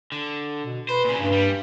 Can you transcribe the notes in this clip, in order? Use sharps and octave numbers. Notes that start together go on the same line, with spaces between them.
D3
B2
B4 C5
A#2 C#3
G2
G3